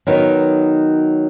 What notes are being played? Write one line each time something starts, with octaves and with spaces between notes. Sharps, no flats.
D#3 F#3 B3 D#4